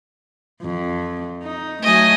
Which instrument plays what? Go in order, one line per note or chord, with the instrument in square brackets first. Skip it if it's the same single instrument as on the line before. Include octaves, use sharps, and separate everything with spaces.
[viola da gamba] F2
D#4
[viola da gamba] F#3 A3 [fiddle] D#5 G#5